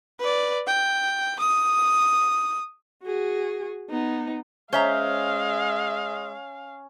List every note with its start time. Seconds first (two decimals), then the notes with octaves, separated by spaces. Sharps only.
0.20 B4 D5
0.67 G5
1.40 D#6
3.03 F#4 G#4
3.90 B3 D#4
4.73 G#3 C#4 C5 E5 F5 A#5